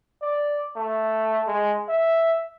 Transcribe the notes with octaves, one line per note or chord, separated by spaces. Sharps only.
D5
A3
G#3
E5